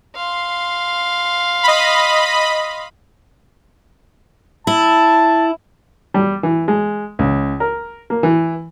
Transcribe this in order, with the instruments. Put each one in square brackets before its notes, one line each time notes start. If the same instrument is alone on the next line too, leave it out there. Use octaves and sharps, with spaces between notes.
[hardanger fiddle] F5 C6
[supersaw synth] D#5 B5
[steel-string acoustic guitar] E4 [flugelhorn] A5
[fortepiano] G3
E3
G#3
C#2
A#4
A#3
E3